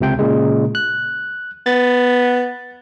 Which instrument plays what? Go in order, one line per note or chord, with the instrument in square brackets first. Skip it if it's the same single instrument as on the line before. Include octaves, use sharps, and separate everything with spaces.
[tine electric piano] C#2 C3 G5
A#2 C#3 G#3
F#6
[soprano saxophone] B3 [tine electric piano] A6